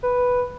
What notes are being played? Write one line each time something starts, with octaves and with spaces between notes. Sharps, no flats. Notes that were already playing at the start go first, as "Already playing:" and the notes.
B4